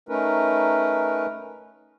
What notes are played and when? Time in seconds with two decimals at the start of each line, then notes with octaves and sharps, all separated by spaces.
0.09 A3 C#4 D#4 A#4 B4